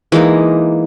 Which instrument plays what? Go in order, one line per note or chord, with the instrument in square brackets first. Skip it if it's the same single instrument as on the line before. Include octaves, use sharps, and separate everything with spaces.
[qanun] E3 G#3 A#3 D#4